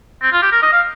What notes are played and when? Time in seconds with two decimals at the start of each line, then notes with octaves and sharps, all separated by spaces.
0.22 C4
0.32 F4
0.42 G4
0.52 A#4
0.62 D#5
0.72 F5